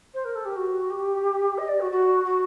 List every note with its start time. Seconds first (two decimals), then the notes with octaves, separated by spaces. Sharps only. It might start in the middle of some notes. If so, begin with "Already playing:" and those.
0.14 C5
0.25 A#4
0.35 A4
0.45 G4
0.56 F#4
0.90 G4
1.58 D#5
1.68 D5
1.80 F#4
1.91 F#4
2.25 F#4